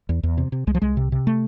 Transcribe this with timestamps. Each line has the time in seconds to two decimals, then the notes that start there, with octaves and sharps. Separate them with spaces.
0.09 E2
0.23 E2
0.37 C3
0.52 C3
0.67 C2 G#3
0.75 F3
0.82 C2 G#3
0.97 C3
1.12 C3
1.27 A3